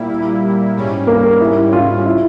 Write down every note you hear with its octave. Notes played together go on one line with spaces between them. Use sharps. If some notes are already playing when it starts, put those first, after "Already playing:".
Already playing: A#2 G3 A#3 E4
G#2 G3 C#4
A#3
E4
F4
E4